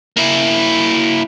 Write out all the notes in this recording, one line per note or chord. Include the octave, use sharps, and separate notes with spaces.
A#3 E4